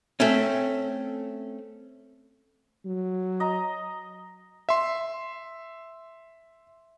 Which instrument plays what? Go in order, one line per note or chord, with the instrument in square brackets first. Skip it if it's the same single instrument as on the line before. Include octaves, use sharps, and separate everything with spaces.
[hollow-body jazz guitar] A3 C4 C#4
[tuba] F#3
[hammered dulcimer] D#5 A#5
[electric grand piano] E5 C6